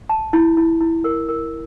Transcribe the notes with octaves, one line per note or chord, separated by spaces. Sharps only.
A5
E4
E4
E4
A#4
A#4